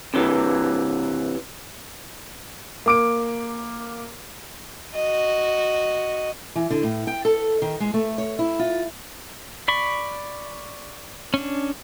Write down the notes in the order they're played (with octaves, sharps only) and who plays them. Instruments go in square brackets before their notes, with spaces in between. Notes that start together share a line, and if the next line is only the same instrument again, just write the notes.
[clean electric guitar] C3 E3
[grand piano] A#3 D6 D7
[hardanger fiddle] F#4 D#5
[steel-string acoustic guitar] E3
D3
A2
G5
A4
D#3
G#3
A3
C#5
E4
F4
[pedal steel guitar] D5 B5 C#6
C#4 D4